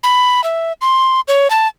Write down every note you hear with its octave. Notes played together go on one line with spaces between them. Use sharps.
B5
E5
C6
C#5
A5